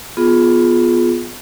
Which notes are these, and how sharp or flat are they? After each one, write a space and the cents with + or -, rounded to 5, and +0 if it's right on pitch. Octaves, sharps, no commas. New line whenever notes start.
B3 +0 F4 +10 G#4 +10